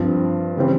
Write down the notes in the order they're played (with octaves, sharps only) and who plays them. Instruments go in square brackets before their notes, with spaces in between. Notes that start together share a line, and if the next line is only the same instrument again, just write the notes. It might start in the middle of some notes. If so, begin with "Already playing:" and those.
Already playing: [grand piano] G2 F3 C4
C#3 E3 G3 C4